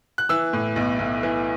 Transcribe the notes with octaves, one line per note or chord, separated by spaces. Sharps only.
F#6
E3 E6
A2
B1
B1
E3